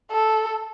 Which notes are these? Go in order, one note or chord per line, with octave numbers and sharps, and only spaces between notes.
A4